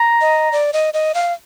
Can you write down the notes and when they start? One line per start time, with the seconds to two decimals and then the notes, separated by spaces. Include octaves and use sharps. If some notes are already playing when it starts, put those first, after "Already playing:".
Already playing: A#5
0.21 D#5
0.52 D5
0.73 D#5
0.94 D#5
1.14 F5